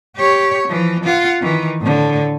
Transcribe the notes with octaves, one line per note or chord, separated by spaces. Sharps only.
G4 C#5
E3 F3
F4 F#5
D#3 E3
A2 D3